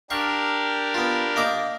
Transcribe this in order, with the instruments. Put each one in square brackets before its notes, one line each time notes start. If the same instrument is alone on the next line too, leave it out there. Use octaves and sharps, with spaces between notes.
[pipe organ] D4 G4 A#4 [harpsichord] F5 C#6
[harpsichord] B3 F4
A#3 D#5 D6